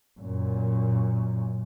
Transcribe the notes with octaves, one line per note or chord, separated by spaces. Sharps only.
F#2 A#2